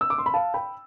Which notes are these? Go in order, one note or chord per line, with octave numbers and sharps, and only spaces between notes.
E6
D6
C6
B5
F5 A5
G5 B5